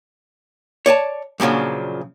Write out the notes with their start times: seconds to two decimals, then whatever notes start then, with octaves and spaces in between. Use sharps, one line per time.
0.86 C#5 D5 G#5 A5
1.40 F#2 A#2 C#3 F3 D4